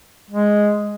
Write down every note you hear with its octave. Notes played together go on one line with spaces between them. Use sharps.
G#3